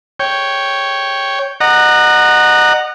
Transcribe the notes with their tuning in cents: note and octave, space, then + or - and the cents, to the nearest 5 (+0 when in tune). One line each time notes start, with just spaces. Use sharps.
C#5 +0 G5 +0
D#5 -35 F#5 +0 A#5 +0